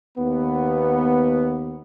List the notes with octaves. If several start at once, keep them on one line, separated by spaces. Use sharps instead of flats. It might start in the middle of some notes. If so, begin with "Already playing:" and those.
D#2 B3